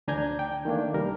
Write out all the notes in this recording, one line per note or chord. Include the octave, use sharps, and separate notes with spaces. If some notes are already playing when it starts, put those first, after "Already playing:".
D2 D4 G#5 A#5 G6 G#6
G5
D#3 A3 A#3 D4
C2 G3 A#4